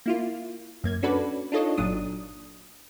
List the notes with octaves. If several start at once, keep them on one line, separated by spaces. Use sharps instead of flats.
A#3 E4 F4
F#2 A#3 G#6
C#4 D4 F#4 A4 B4 D5
D4 D#4 F4 A4 C#5 D#5
G1 A#2 F#3 D4 D#6